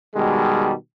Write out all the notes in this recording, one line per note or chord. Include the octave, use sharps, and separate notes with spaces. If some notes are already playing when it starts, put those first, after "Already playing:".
B2 D#3 G3 G#3